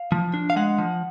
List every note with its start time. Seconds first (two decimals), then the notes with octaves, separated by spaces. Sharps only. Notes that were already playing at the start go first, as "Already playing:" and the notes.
Already playing: F5
0.12 F3
0.34 D4
0.50 F5
0.56 G#3 F#5
0.78 F3